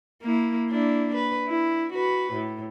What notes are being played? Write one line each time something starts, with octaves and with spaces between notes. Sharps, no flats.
A#3 E4
A#3 D4 E4
B4
E4
F#4 B4
A2